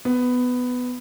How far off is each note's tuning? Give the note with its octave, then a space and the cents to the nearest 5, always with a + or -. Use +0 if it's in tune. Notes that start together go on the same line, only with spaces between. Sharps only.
B3 +10